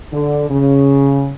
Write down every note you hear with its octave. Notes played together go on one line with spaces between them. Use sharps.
D3
C#3